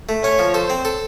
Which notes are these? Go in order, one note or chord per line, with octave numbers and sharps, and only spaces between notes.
A3
C#4 C#5
F3
A4 C5
C4
A4